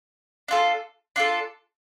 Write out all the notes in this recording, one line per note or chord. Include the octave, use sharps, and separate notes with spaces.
D4 F4 A4
D4 F4 A4